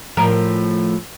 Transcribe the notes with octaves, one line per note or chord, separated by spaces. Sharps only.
A2 F3 A#4